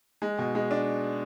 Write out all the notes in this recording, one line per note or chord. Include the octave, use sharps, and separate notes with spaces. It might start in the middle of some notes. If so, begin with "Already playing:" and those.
G#3
B2
G#3
D4